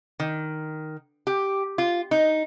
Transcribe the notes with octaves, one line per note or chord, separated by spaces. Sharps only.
D#3
G4
F4
D#4